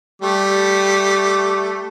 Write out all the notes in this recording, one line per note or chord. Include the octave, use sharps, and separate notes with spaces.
G3 A3 D6